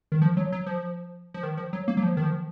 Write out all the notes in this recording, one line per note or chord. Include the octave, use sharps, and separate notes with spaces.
D#3
F3
F#3
F#3
F3
F3
D#3
F3
F#3
A#3
F#3
F3
D#3
F3